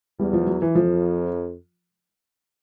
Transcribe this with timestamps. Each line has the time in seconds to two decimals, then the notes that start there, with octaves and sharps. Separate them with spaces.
0.19 E2 G3
0.33 F3
0.47 F#3
0.62 E3
0.75 F2 F3